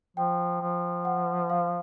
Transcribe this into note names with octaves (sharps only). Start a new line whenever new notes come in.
F3 G5
F3
F#5
F5